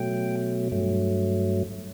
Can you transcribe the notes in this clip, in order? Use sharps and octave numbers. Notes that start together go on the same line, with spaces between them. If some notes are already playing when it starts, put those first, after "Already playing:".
Already playing: B2 F#3 A3 G5
G2 F#3 A3